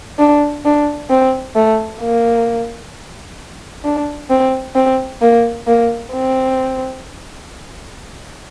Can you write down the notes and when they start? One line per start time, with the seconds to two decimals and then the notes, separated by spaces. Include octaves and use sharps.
0.19 D4
0.65 D4
1.10 C4
1.55 A3
2.01 A#3
3.85 D4
4.30 C4
4.75 C4
5.21 A#3
5.67 A#3
6.12 C4